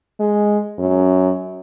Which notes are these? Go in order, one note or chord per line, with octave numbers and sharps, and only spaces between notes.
G#3
F#2